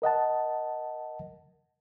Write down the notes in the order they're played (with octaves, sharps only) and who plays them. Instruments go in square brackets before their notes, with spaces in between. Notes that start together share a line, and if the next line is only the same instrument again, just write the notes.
[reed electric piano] A#4 D#5 F#5 A5